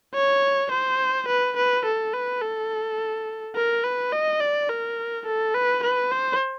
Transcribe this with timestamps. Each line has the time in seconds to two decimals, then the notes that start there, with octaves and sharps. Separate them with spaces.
0.15 C#5
0.72 C5
1.28 B4
1.57 B4
1.85 A4
2.13 B4
2.42 A4
3.56 A#4
3.84 B4
4.12 D#5
4.41 D5
4.69 A#4
5.26 A4
5.55 B4
5.83 B4
6.11 C5